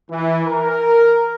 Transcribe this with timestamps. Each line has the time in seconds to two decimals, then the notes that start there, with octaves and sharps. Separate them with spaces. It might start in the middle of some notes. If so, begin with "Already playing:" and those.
0.10 E3
0.47 A#4